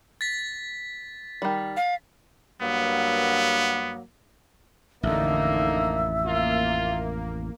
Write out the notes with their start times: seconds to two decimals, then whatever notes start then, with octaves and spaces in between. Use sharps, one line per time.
0.21 A6 B6
1.42 D#3 G3
1.77 F5
2.61 G2 F#3 A#3 B3
5.03 A1 F2 D3 A#3 D#4 E5
6.25 A#3 F4